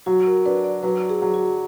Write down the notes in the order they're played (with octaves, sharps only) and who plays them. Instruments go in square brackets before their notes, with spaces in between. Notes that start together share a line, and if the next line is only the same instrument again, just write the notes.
[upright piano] F#3 [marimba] F#4
[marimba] A#4
[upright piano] D4 [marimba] B4
[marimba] D5
[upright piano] F#3 [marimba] B4
[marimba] G#4
[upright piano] F#3
[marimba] F#4